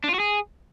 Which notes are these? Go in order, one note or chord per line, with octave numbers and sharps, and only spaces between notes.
D4
F4
F#4
G#4